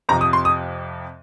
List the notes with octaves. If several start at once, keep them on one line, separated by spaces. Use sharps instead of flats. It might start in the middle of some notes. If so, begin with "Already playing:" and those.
F2 C3 F3 A#5
D#6
C6
D#6